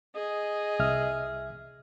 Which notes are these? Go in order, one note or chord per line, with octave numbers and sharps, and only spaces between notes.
G#4 D#5
C2 E5 F6